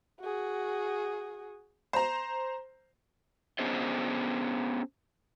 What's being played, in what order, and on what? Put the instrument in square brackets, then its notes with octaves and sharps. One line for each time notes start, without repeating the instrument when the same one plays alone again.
[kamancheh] F#4 G#4
[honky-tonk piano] C5 A#5
[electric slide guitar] B3 C#4 D4 G#4 C5 D#5